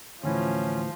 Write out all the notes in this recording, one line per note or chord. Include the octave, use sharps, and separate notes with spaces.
D2 A2 E3 F3 C#4